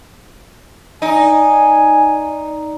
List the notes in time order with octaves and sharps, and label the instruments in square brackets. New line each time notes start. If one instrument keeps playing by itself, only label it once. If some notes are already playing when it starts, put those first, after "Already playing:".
[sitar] D#4 [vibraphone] D5 A#5 [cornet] G#5